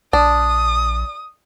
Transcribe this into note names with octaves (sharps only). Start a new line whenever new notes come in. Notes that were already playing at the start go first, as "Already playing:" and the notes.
A#1 D4 D#6